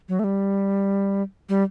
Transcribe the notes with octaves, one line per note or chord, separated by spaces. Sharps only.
F#3
A3
G3
G3